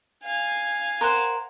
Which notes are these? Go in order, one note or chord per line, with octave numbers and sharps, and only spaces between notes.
F5 G#5
A#4 C5 F#5